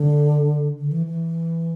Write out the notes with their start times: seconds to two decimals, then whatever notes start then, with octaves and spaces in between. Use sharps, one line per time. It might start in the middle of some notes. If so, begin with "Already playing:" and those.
Already playing: D3
0.78 D3
0.92 E3
1.06 E3